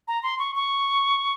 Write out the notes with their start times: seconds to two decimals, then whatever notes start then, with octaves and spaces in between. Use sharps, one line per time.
0.08 A#5
0.23 C6
0.39 C#6
0.55 C#6